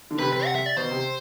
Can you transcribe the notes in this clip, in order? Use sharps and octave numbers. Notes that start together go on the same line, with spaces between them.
D3
C3 B4
B4
F#5
E5
D5
B2 C5
C3